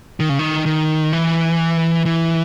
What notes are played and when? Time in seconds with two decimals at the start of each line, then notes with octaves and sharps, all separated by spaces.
0.20 D#3
0.29 C#3
0.39 D#3
0.66 D#3
1.13 E3
2.06 E3